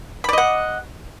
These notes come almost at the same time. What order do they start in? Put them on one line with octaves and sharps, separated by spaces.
B5 D5 D#5 F#5